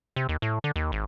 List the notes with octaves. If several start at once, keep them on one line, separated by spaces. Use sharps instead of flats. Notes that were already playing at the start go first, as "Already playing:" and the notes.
C3
D#2
A2
D3
D#2
G#1